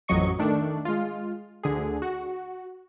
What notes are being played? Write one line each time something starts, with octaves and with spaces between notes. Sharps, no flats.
A1 F2 F#3 D#5 C#6 C#7
D#3 A3 D4
G#3 F4
D2 D3 G#4
F#4